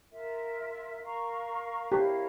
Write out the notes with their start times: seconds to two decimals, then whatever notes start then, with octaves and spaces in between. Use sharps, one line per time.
0.10 F4 A#4 E5
1.01 A#4 F5 A#5 C#6
1.92 E4 G4 A#4 C#5 F5